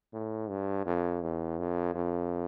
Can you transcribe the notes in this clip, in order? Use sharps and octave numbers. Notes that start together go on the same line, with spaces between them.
A2
G2
F2
E2
F2
F2